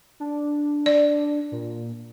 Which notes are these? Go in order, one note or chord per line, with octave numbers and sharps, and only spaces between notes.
D4
D5
A#2